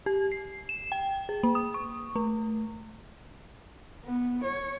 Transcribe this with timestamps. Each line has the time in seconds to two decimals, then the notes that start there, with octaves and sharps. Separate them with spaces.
0.06 G4
0.32 C7
0.69 E7
0.92 G5
1.29 G#4
1.43 A#3
1.55 D#6
1.74 C#6
2.16 A3
4.05 B3
4.44 C#5